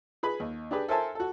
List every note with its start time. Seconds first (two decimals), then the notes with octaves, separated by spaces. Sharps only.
0.23 G#4 B4 B5
0.40 D#2
0.71 D4 G4 G#4 B4
0.88 A4 A#4 C5 E5 G#5 A5
1.15 F#4 A4